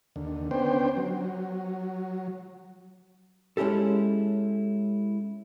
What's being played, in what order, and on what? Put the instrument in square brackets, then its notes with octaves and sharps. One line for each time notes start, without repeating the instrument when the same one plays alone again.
[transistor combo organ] D#2 D3
B3 C#4 D4 C5 G5
F#3
[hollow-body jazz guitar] G#3 C#4 E4 G4 A4